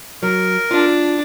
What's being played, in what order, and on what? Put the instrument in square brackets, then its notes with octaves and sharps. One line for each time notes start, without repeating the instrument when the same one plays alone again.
[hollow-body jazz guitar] F#3 [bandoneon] A#4
[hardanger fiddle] D4 [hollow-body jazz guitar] F4